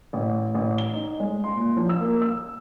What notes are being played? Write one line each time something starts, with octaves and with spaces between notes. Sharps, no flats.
A1
A1
G7
D#4
G#3
C6
A#2
F3
E6
A#3
E6